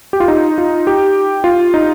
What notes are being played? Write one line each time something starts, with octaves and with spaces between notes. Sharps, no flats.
G4
F4
D#4
F4
G4
F4
D#4